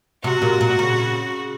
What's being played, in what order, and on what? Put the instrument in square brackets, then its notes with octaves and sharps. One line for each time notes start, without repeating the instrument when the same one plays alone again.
[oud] C3 [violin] F#4
[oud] A#2
A#2
C#3